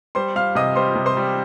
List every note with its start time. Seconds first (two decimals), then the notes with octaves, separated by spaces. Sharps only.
0.15 G3 C5 C6
0.35 G3 F5 F6
0.55 C3 D#5 D#6
0.75 G3 C5 C6
0.96 C3
1.06 C5 C6
1.17 G3